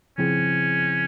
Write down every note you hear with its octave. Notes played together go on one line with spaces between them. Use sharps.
C#3 F3 C4 C#4 E4 G#4